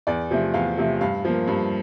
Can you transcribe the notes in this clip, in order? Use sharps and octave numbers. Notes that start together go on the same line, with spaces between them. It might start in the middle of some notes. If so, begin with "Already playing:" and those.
E2 D5
C3 F3 A3
E2 F5
C3 F3 A3
G2 F5
F3 A#3
G2